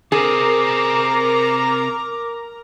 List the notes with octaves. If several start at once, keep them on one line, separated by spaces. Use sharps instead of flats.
C3 C4 G#4 A#4 A#5 D6